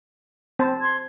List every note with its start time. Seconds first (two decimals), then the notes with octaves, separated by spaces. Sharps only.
0.59 C4 C5 A5
0.82 C6 G#6